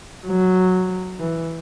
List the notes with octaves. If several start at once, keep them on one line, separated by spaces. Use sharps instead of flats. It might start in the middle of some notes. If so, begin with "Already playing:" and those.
F#3
E3